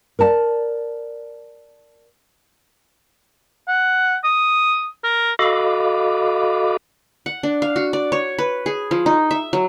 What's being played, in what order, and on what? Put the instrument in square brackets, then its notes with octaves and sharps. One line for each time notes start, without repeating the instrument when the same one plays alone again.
[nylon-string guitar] A#4 D5 A5
[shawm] F#5
D#6
A#4
[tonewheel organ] F#4 A4 D#5 F5 B5 D6
[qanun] F#5
D4
F5
F#4
D5
C#5
B4
G#4
F3
D#4
E5
F#3